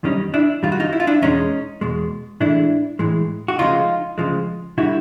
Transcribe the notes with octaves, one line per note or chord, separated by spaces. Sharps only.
F#2 D#3 G3 C#4 D#4
D4 E4
F#2 D#3 G3 F4
F#4
D#4 F4
E4
F4
D4 E4
E2 B2 G#3 C#4 D#4
E2 B2 G#3
A2 E3 G#3 D4 E4
A2 E3 G#3
F#4
D2 C#3 F3 G#3 D#4 F4
D2 C#3 F3 G#3
D3 G3 E4 F#4